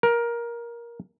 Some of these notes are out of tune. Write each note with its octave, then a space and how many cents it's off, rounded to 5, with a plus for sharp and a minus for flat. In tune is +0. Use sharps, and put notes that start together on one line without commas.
A#4 +15